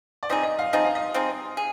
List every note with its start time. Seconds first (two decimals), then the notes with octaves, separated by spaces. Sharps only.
0.23 D5
0.29 F3 C4 D#4 G#4 D#5
0.43 D#5
0.59 F5
0.73 F3 C4 D#4 G#4 D#5
0.84 F5
0.95 D#5
1.14 F3 C4 D#4 G#4
1.57 G#4